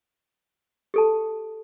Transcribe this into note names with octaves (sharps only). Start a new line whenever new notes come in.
G4 A4 A5